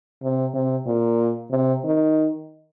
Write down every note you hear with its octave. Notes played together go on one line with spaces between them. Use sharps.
C3
C3
A#2
C3
D#3